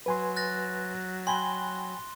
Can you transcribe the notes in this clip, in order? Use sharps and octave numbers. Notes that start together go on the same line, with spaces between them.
F#3 B4 G#5 C6
F#6 A6 A#6
G5 G#5 B5 C6 G7